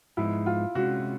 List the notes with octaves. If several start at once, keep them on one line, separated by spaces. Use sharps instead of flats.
G#2 F3 G#3 B3 D#4 E4
F4
C3 E3 G#3 C#4 F#4